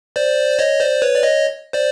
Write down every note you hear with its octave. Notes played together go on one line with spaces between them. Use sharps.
C5 D5
C#5 D#5
C5 D5
B4 C#5
D5
C#5 D#5
C5 D5